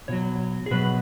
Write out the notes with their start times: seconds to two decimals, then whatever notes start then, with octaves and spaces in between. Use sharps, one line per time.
0.08 B2 F#3 C#5
0.66 G#4
0.71 B2 F#3 B4